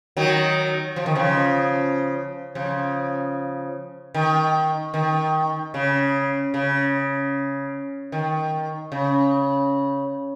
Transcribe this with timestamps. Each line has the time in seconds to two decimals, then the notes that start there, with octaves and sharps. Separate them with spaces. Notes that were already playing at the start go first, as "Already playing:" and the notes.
0.17 D#3 F#3
0.96 F3
1.06 D#3
1.15 C#3 F3
2.55 C#3 F3
4.15 D#3
4.94 D#3
5.74 C#3
6.54 C#3
8.12 D#3
8.92 C#3